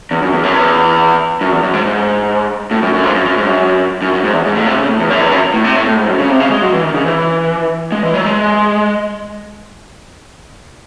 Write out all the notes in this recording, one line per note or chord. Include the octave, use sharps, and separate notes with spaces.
E2
F#2
E2
F#2
E2
F#2
E2
F#2
G#2
G#2
A2
F#2
F#2
G#2
F#2
F#2
G#2
F#2
F#2
F#2
G#2
E2
G#2
A2
C3
C#3
A2
E2
F#2
E2
F#2
A2
C3
A2
A2
G#2
F#2
C#3
C3
C#3
G#3
F#3
E3
D#3
C#3
E3
G#3
E3
F#3
G#3